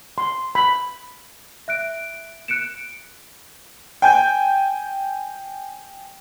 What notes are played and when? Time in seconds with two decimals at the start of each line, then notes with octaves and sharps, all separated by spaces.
0.18 C6
0.55 B5
1.68 E5 F#6 D7
2.48 F#6 C#7 D7 E7
4.02 G5 G#5 G6